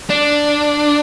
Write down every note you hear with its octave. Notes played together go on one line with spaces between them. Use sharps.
D4